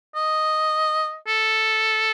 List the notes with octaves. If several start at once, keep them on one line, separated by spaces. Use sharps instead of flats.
D#5
A4